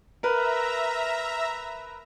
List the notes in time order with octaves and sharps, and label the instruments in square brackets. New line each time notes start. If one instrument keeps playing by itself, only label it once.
[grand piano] A#4 B4 [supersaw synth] E5 A#5